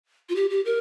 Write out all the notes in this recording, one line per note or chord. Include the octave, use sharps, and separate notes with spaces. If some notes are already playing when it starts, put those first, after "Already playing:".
F4
G4
G4
A#4